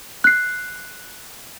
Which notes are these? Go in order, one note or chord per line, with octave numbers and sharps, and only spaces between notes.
F#6 C7